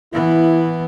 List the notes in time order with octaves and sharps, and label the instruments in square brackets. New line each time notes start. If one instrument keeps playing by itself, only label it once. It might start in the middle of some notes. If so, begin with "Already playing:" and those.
[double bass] E3 B3 [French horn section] E4